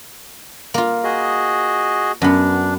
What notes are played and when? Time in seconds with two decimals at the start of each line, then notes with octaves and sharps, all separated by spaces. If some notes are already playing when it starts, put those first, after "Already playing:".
0.74 A#3 F4
1.04 F#4 G#4 D#5
2.22 F#2 B3 D4